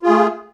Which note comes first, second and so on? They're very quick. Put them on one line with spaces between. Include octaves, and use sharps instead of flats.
F4 G#4 A3